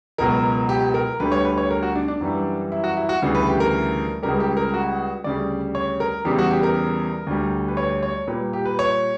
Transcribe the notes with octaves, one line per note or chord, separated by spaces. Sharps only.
C#2 B2 F#3 A#4
G4
A#4
D2 D3 G3 B4
C#5
B4
C#5
A#4
F#4
D4
D4
F#2 E3 G3
E4
F#4
E4
F#4
D2 C#3 E3 G3
B4
G4
A#4
C#2 C#3 G3 A#4
G4
A#4
F#4
D2 C#3 G3 D5
C#5
A#4
E2 C#3 G3 G4
F#4
G4
A#4
D2 D3 G3
B4
C#5
C#5
A#2 G3 B4
G4
B4
C#5